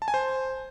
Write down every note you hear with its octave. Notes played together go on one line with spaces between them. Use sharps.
A5
G#5
C5